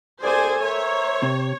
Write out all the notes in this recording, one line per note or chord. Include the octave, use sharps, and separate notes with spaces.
C2 G#4 A4 C5 D5 G#5
A#4 C5 C#5 E5
C3